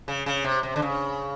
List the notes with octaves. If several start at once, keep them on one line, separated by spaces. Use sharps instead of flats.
C#3
C#3
C3
C3
D3
C#3